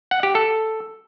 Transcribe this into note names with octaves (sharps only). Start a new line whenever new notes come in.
F#5
G4
A4